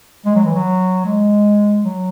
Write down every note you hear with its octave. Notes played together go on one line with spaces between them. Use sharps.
G#3
F#3
E3
F#3
G#3
F#3